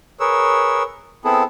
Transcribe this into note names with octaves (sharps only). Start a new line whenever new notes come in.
G#4 A#4 B4 C#5 E6
B3 C4 E4 G#4 A4